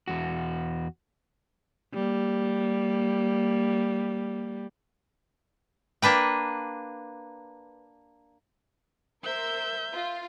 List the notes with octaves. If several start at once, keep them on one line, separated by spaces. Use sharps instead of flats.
E2 F#4
G3 A#3
A#3 D4 B4 G5
A#4 C5 E5 E6 G6
F4